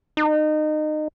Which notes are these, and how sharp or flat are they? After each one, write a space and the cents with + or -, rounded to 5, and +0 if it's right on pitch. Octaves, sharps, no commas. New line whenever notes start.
D#4 -25